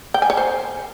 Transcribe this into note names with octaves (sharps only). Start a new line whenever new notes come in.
G5
G#5
C#5
C5